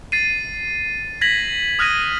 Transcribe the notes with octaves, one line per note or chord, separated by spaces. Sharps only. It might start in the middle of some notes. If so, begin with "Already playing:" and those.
A6 C7 D#7
G#6 A#6 B6 F#7
D#6 F6 F#6 G#6 A#6 D#7